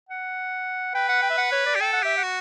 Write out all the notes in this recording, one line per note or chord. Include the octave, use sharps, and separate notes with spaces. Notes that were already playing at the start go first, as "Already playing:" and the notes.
F#5
B4 G5
F#5
G5
E5
F#5
C#5
D5
G4
A4 G5
F#5
G4 E5
F#5
F#4